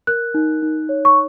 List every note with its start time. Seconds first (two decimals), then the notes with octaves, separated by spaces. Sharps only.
0.07 A#4 F#6
0.34 D#4
0.62 D#4
0.89 C#5
1.05 C#6